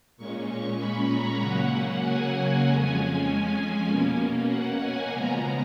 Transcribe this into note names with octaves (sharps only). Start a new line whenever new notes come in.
A#2 G#3 C#4 C#6
C#6
B5
A#5
C#3 F#3 A#3 C#4 F#5
G#5
F2 F3 G#3 C#4
B2 A#3 C#4
F#5
G#5
C#3 F3 G#3 B3 A#5